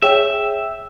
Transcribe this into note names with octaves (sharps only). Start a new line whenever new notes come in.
G#4 C#5 E5 G5